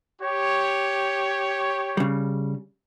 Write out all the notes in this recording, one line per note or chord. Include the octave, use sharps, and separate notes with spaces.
G4 C#5
C#3 G3